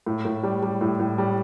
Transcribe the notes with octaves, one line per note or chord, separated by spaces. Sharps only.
A2
A2
G3
G3
A2
A2
G3